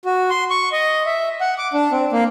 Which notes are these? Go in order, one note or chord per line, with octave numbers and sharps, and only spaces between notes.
F#4
C6
C#6
D#5
E5
F#5
D6
D4
C4
A#3